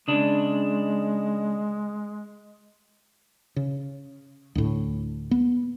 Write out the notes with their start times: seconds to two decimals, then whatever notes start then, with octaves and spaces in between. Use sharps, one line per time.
0.08 C#3 G#3 D4
3.56 C#3
4.55 D2 A2
5.31 B3